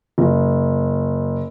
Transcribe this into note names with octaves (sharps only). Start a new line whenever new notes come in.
F#1